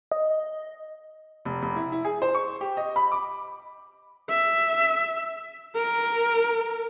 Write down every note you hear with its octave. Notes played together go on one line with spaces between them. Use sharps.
D#5
F1
F1
E4
E4
G#4
C5
C#6
G4
D#5
B5
D6
E5
A#4